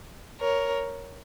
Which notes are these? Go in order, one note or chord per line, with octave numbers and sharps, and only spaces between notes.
A#4 C#5